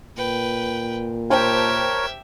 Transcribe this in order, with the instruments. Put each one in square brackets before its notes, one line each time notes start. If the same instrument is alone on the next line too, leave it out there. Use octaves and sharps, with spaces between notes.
[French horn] A#2 [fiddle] B4 G5
[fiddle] G4 E5 [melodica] A#4 C#5 [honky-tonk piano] C5 G5 A5